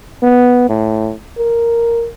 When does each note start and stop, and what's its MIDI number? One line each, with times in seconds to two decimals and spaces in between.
0.23 0.65 59
0.69 1.13 45
1.38 2.09 70